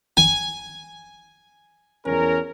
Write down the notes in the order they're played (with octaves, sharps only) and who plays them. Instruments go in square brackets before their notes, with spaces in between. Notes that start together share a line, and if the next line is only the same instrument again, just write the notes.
[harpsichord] G#5
[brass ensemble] E2 C#4 A#4